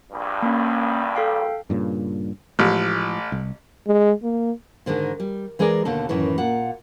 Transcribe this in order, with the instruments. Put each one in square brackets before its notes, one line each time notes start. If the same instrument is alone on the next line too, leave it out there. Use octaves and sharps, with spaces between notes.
[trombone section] A#1 G2
[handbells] A#3 C#4
A4 F5 G5
[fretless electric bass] G2 A#2 C#3
[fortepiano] A1 [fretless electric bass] A2 F3 G#3
[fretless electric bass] C2
[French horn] G#3
A#3
[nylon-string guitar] G#2 D3 D#3 G#3
G3
E3 G#3 G#4 A#4 D5
D#2 B2 D3 A3 A4
F#2 A2 D#3 E3
A#2 F#5